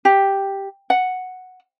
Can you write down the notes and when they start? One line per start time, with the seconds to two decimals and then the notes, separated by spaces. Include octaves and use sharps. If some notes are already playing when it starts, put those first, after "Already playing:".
0.05 G4
0.90 F#5